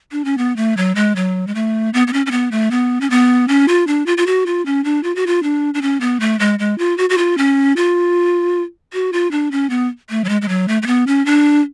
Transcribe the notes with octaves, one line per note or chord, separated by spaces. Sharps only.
D4
C#4
B3
A3
F#3
G#3
F#3
G#3
A3
B3
B3
C#4
C#4
B3
A3
B3
C#4
B3
C#4
F4
D4
F4
F4
F#4
F4
C#4
D4
F4
F#4
F4
D4
D4
C#4
B3
A3
G#3
G#3
F4
F#4
F#4
F4
C#4
F4
F#4
F4
D4
C#4
B3
A3
F#3
G#3
G#3
F#3
A3
A3
B3
C#4
D4